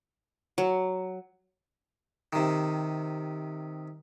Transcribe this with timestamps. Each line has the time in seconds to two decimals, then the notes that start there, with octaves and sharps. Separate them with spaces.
0.58 F#3
2.33 C3 D#3